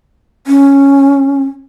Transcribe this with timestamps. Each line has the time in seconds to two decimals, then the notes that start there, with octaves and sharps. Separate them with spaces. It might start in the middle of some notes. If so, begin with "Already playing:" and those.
0.47 C#4